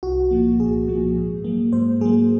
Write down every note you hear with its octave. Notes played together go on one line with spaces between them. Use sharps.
C2 F#4
A#2 F3 A#3
C2 G#4
A#2 F3 A#3
G#2
F#3 A#3
G#2 C5
F#3 A#3 G#4